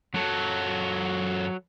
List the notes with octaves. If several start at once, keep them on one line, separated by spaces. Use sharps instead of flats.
F#2 F#3 A4